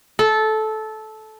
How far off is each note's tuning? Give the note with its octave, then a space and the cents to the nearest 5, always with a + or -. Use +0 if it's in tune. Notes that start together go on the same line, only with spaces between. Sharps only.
A4 -15